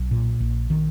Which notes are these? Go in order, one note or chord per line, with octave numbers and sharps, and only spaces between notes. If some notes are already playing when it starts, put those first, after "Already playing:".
Already playing: B1
A#2
A#1
D#3